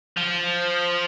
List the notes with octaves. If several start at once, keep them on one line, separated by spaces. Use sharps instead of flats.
F3